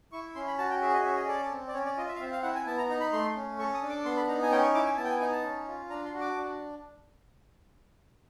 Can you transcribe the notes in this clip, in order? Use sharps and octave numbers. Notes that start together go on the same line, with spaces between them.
E4 C#6
C#4 C6
B5
F#4 A5
G5
G#4 E5
D#5
C#4 E5
D#5
A4 D5
C4
D5
C#4 C#5
D5
F4 D#5
E5
F5
C4 E5
F5
E4 F#5
G#5
B3 A5
A#5
D#4 A#5
B5
A3 C6
C#4
A4 C#6
D#6
D4
D6
B3 C6
B5
D#4 A#5
G#5
C#4 G5
C#6
E4 D6
G#5
B3 A5
G5
G#5
D#4 G#5
A5
C#4
F4
D4 A#5
C6
F#4
D6
D4